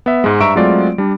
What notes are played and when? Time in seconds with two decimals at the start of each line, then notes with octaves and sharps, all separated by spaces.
0.06 B3 E5
0.24 G#2 G#3
0.40 G2 E5 A#5 C#6 E6 D7
0.55 F#3 G#3 A3 C4 F4 D5
0.98 G3 D4